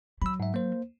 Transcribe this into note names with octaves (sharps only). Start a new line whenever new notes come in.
F#3 B5 E6
G#2 E5
A#3 C5